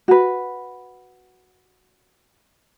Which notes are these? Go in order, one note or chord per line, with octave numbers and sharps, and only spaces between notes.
F#4 B4